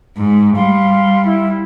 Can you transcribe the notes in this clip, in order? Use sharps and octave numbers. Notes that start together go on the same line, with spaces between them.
G#2
G3 F5 C6
E4